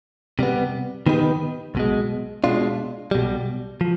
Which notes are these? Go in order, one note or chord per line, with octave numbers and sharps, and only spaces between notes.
C3 G3 B3
D#3 B3 D#4 G4 B4
B1 B2 G#3
B2 G#3 D4 F4
B1 B2 G3
F3